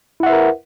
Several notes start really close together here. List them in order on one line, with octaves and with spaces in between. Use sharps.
E4 F#5 E5 B4 A#4